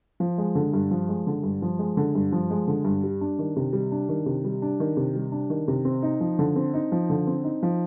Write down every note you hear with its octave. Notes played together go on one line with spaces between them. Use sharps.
F3
G#3
D3
G2
F3
G#3
D3
G2
F3
G#3
D3
G2
F3
G#3
D3
G2
G3
D4
D#3
C3
G3
D4
D#3
C3
G3
D4
D#3
C3
G3
D4
D#3
C3
C4
D#4
F3
D3
C4
D#4
F3
D3
C4
D#4
F3